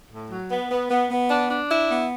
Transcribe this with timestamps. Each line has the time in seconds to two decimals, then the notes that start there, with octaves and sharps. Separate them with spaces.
0.10 A2
0.30 F#3
0.50 B3
0.70 B3
0.90 B3
1.11 B3
1.30 D4
1.50 D4
1.70 E4
1.91 B3